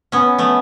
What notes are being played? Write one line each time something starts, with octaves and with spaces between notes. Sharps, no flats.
B3 C#4
A3 B3